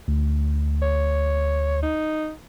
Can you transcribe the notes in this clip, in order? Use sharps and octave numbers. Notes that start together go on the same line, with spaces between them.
D2
C#5
D#4